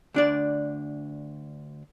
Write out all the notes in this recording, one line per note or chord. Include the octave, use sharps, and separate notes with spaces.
D2 D4 D5